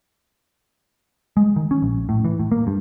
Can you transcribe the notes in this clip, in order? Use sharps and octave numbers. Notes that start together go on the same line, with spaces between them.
G#3
D#3
C#4
A#1
A2
E3
A2
A#3
G2